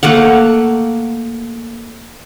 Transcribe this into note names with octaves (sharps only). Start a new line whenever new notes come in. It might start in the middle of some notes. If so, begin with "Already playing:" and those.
A3 A#3 F5 F#5